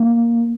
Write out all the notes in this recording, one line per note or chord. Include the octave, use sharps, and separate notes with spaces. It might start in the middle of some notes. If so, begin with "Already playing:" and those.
Already playing: A#3